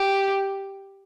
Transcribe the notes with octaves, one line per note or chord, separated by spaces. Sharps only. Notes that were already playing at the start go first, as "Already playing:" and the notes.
Already playing: G4